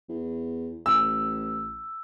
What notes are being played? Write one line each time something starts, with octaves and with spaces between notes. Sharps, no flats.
E2
A1 E6